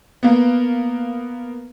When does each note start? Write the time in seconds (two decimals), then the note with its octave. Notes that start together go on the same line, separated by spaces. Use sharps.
0.23 A#3 B3